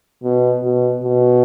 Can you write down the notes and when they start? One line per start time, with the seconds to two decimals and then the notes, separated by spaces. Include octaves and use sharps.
0.23 B2
0.63 B2
1.03 B2